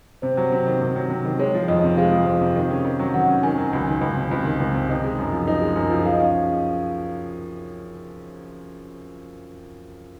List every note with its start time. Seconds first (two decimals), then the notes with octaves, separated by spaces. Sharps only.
0.22 C3 C5
0.37 F#3
0.52 C3
0.66 D#3
0.81 C3
0.96 F#3
1.10 C3
1.25 D#3
1.39 G#3 C#5
1.54 F3
1.68 F2 D#5
1.84 C3
1.97 G#3 F5
2.12 F3
2.26 F2
2.41 C3
2.55 D#3
2.70 C#4
2.85 D#3
2.99 F#3
3.14 D#3 F#5
3.28 C#4
3.43 D#3 G#5
3.58 F#3
3.72 C#2 G#5
3.87 D#3
4.01 C#2
4.16 C3
4.31 C#2
4.45 D#3
4.60 C#2
4.74 C3
4.89 D#4
5.04 G#3
5.19 F#2
5.32 F3
5.47 D#4
5.61 G#3
5.76 F#2
5.91 F3
6.05 G#4 F5
6.12 D#5
6.20 C#4 F5